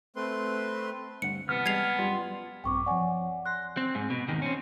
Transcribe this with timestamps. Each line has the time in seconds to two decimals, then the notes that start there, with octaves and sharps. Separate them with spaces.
0.16 A3 C4 B4 C6
1.22 D2 G2 F#5 C#7
1.49 C3 E3 B3 A5 F6
1.66 G3 G#3 G#6 C7 F7
1.99 F#2 G3 F4
2.64 A#1 G2 C4 G5 C#6 D6
2.86 F3 C#5 D5 F#5 G#5
3.46 C6 F#6 A#6
3.77 C4
3.95 G#2
4.10 B2
4.28 E2 D#3
4.42 C4 C#4